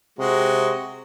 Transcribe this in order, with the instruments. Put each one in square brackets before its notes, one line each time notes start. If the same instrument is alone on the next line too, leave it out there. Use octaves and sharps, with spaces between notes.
[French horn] C3 [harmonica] G#3 F#4